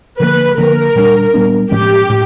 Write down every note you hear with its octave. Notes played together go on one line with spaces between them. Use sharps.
D3 F3 A#3 B4
D3 F3 A#3 A#4
A#2 G3 B3 D4
A#2 G3 B3 D4
A2 F3 G#3 C#4 G4
A2